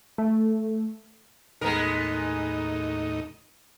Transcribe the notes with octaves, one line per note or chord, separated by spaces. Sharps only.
A3
D#2 A2 G#3 B3 D#4 A#4